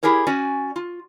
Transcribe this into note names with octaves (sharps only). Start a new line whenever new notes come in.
E4 G4 G#4 A#4 C#5
C#4 F#4 D5 G#5
F4